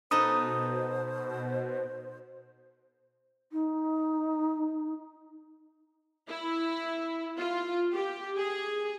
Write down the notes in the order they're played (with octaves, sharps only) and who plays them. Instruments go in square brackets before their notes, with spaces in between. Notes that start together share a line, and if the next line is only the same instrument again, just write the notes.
[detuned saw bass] B2 [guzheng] D#4 A4 B4 [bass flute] C5 [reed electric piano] D#6
[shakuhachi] D#4
[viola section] E4
F4
G4
G#4